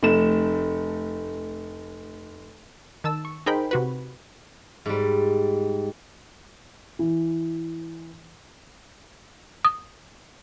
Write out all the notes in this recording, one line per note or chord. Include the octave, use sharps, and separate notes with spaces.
F1 A3 E7
D#3 A5 E6
C#6
D#4 G#4 A#4 C5 G5 B5
C3 F#4 B4
G#2 G3
E3
D#6